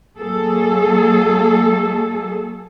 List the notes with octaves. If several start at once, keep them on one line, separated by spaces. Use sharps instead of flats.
F#3 G#3 A#3 G#4 A4